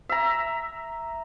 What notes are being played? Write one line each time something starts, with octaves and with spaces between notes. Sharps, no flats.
E5 A#5